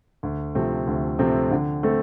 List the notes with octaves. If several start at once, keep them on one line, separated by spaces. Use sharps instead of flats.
D2
C3 F3 A3 C4
D2
C3 F3 A3 C4
D3
A3 C4 A4